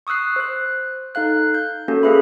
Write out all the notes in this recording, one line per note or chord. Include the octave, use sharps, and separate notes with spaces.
C#6 D#6 E6 F#6 C7
C5 F#6
D#4 A4 F5 F#6
G6
A#3 C#4 F#4 A4
A#3 G#4 B4 E5 B5